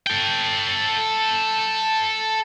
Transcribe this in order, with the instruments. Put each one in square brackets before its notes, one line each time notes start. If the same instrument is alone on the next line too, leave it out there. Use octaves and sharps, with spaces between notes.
[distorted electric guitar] A4 G5